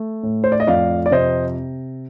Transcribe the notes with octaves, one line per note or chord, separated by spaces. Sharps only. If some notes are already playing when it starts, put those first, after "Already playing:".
Already playing: A3
A2
C5
D5
D#5
F2 D5 F5
D5
C3 C5 D#5